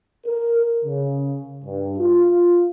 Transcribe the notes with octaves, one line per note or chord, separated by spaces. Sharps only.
A#4
C#3
G2
F4